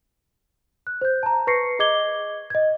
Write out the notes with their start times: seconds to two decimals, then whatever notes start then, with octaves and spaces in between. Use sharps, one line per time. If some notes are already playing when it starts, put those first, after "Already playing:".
0.87 F#6
1.01 C5 G6
1.23 A5 A#5
1.47 B4 C#6 A#6 C7 C#7
1.79 G#4 D#5 D6 G#6 G7
2.50 D#5 G#6